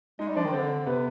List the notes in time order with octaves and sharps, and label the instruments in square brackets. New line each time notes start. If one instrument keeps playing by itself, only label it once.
[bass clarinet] G#3 [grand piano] D#4 D#5
[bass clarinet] G3
[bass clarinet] F3 [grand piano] D4 D5
[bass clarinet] D#3
[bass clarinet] D3 [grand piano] C4 C5
[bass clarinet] C3 [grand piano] B3 B4